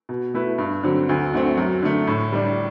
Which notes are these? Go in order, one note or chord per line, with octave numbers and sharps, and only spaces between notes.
B2
A3 E4 B4
G2
D3 F#3 C4
D2
D3 A3 C4
F#2
D3 A3
A2
G3 D4